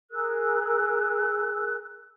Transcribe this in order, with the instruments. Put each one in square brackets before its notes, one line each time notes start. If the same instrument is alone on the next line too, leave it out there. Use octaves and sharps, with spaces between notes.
[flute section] G#4 A#4 E6 F#6